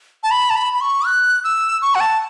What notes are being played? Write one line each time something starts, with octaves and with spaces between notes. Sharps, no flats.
A5
B5
A5
B5
B5
C#6
F#6
E6
C#6
F#5
A5